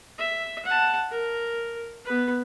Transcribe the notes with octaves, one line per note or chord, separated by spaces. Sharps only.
E5
F#5 A5
A#4
B3 B4